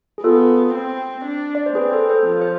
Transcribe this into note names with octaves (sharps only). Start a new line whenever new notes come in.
G#4
B3 F4 A4
C4
D4
D5
C5
C4 G#4 B4
A4 C5
A4 C5
F3
C5